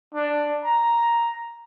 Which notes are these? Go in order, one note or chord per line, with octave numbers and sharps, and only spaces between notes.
D4
A#5